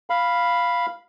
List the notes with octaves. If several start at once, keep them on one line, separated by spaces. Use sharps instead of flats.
F5 B5